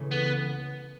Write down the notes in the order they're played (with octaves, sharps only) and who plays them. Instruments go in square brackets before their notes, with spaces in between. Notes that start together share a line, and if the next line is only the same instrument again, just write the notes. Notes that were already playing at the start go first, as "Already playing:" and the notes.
Already playing: [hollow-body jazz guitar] C#2 C#3 E3 A3
[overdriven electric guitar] B3